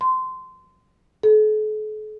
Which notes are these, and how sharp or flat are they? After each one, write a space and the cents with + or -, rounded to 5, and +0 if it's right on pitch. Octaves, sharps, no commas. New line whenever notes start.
C6 -20
A4 -45